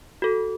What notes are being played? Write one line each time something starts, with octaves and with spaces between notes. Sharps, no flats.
F#4 A4